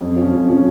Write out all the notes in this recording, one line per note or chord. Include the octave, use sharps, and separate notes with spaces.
F2
F3 C#4
F2
F3 C#4